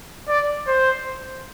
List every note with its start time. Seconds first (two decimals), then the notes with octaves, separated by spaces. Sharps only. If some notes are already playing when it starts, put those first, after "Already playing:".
0.28 D5
0.67 C5